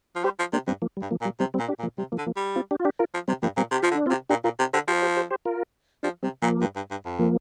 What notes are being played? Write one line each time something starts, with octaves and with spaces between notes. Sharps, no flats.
F3
G3 G4 C5
F3
C3 A#3 D4
G2 G3 C4
F3 A#3
G3
G2
F3 A#3
A#2
G3
C3 G3 C4
G3 C4
A#2
D4 G4
A#2
F3 A#3
C3 G3
F3 A#3
D3
F3 A#3
G3
C4 F4
D4 G4
F4
D4 G4
F4 A#4
F3
C3 G3 C4
G2 F3 A#3
A#2 G3 C4
C3 G4
F3 F4
D3
D4
C4 F4
C3
A#2 D4 G4
A#2 F4 A#4
C3
D3 G4 C5
F3 G4 C5
G4 C5
G4 C5
G4 C5
F4 A#4
F3 D4 G4
C3 G3 C4
A#2 F3 A#3
G2
G2
G2
F2
F3 A#3